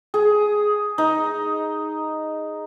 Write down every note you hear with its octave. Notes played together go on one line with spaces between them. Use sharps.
G#4
D#4